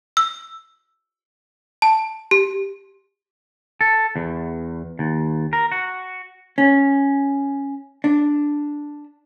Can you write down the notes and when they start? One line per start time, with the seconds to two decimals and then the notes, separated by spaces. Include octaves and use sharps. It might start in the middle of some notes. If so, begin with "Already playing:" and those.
0.17 E6
1.82 A5
2.31 G4
3.81 A4
4.16 E2
4.99 D#2
5.53 A#4
5.72 F#4
6.58 C#4
8.04 D4